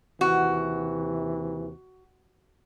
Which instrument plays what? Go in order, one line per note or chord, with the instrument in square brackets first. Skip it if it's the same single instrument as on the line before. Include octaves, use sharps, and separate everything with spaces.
[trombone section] D#2 C3 E3 [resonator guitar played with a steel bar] F#4